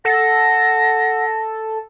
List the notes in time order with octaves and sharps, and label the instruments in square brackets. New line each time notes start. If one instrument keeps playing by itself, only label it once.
[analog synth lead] A4 [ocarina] F#5 [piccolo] A#6